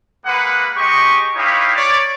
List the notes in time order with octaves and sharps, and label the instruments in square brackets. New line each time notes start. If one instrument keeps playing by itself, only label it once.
[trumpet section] G#3 A#3 B4 F#5
G#3 G4 D#5 G5 C#6
D#4 E4 G4 B4 C#5 F5
C#5 D5